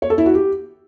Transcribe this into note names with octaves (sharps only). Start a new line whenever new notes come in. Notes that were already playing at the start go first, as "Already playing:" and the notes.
C#5
A4
E4
F#4
G4